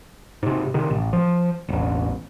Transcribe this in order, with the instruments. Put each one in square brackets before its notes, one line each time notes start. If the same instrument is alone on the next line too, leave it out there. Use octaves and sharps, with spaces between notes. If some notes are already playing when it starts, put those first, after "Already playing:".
[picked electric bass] G#2 C3
C3 D#3
A1
F3
E1 A1